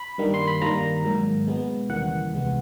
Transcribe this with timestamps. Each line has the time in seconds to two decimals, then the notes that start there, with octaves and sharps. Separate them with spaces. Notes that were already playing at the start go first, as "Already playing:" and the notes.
Already playing: B5
0.18 G2 D#3 G3 A#3
0.34 C6
0.48 B5
0.61 G2 D#3 G3 A#3 A#5
1.04 G#2 D#3 F#3 A#3
1.47 B2 G#3 B3
1.89 D#2 C#3 E3 G3 A#3 F#5
2.32 C2 C3 E3 G#3 B3